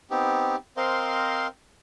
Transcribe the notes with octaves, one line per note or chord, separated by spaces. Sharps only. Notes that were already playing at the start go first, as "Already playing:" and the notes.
B3 C4 D#4 G4
C4 A#4 C5 D#5 F5 C6